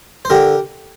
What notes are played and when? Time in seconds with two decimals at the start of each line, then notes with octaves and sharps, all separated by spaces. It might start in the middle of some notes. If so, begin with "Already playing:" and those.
0.25 C5
0.30 D3 G4 A#4